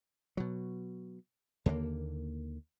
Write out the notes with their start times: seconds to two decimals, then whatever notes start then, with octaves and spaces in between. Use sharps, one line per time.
0.37 B2 F#3
1.66 D#2 D3 G3 A#3